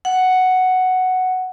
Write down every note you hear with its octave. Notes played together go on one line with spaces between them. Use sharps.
F#5